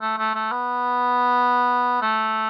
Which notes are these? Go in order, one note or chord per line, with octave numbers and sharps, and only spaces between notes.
A3
A3
A3
B3
A3